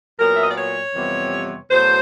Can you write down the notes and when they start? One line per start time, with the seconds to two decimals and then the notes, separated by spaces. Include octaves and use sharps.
0.19 A#2 F#3 B3 A#4
0.35 E5
0.42 D#5
0.49 D5
0.56 C#5
0.95 F2 C3 E3 G3 B3
1.70 E2 B2 F#3 A3 C5